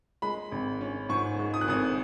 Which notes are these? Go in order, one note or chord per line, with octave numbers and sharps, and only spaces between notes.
G#3 B5
G#1
C#4
G#2 C#6
G#3
D#6
F#6
G#1 D#6